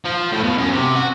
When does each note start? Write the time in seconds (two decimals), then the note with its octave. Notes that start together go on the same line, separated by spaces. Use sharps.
0.05 F3
0.32 A2
0.44 B2
0.58 F#2
0.72 C3
0.96 F#4